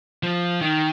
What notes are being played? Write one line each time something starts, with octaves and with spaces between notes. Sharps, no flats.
F3
D#3